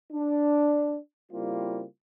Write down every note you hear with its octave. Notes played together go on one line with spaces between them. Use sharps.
D4
C#3 G3 A#3 C4 E4 F4